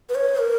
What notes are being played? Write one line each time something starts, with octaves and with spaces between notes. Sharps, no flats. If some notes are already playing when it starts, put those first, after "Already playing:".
B4
C#5
A#4